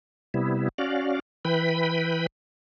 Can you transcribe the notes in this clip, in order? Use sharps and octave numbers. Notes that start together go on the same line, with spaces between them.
C3 G3 B3 E4
C#4 F#4 D5 F5
E3 B4 G5 B5